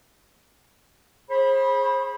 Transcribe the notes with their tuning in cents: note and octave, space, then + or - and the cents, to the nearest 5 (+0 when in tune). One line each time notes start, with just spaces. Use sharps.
G#4 +0 C5 +35 B5 -15